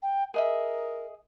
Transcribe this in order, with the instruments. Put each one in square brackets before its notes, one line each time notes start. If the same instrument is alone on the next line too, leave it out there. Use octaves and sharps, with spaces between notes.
[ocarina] G5
[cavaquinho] G#4 D#5 E5 [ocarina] A#4